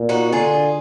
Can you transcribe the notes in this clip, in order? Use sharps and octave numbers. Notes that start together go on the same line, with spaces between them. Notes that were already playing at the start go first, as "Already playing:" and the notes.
Already playing: A#2
D#4 F#4
D3 F4 G#4